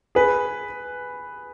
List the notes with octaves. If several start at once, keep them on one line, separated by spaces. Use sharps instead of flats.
G#4 B4